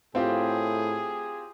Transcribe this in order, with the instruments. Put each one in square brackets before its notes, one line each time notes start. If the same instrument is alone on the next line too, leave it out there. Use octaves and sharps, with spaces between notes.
[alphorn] A2 [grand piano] C4 F4 G4 [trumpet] G#4